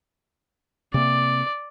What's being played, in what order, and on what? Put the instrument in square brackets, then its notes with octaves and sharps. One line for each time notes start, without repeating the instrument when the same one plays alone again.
[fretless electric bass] C3 A#3 [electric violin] D5